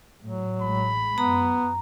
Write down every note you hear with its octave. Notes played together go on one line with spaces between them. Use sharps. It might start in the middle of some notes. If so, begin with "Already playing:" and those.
A2 F#3
A1 G#3 B5
F#2 B3 A#5